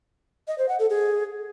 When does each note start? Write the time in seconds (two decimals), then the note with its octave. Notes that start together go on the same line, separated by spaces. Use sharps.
0.48 D#5
0.58 C5
0.69 F#5
0.79 A4
0.90 G#4